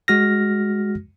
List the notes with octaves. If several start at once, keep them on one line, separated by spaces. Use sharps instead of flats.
G#3 F#4 F6 A#6